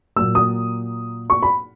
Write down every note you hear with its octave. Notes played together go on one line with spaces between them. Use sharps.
A#2 F#3 A#3 E6
D#6
C#6
B5